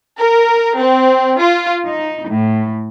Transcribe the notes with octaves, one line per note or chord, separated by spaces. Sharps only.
A#4
C4
F4
D#4
A2